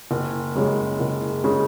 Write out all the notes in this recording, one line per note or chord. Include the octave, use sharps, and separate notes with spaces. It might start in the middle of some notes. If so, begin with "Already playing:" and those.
F#1
F#2 C#3 G#3
F#1
C#3 G#3